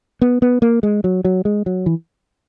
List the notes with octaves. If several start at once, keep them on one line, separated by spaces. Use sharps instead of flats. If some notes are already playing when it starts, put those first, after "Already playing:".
B3
B3
A#3
G#3
F#3
F#3
G#3
F#3
E3